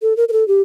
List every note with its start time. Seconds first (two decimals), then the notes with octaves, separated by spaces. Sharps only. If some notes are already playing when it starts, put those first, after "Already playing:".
0.02 A4
0.17 A#4
0.29 A#4
0.33 A4
0.48 G4